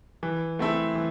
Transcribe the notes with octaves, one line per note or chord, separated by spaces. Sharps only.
E3
A3 C4 E4 A4
E3